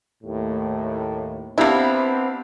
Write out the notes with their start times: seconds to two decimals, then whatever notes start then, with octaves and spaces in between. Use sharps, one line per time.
0.24 D#2 A2
1.58 C3 B3 C4 D4 E4 G4 F5